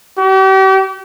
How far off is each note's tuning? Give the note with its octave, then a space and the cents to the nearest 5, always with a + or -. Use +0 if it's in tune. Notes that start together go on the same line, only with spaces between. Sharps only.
G4 -40